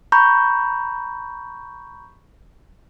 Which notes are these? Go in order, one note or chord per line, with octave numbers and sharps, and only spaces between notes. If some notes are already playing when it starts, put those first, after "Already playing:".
A#5 B5 C#6 G6